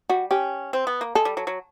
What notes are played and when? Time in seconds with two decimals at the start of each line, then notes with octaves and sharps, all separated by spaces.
0.09 G3 F#4
0.31 C#4 G4
0.73 C4
0.87 B3
1.01 A#3
1.15 G#3 A4
1.25 G3
1.37 F#3
1.47 F#3